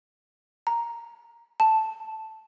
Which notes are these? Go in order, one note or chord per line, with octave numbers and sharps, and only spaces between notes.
A#5
A5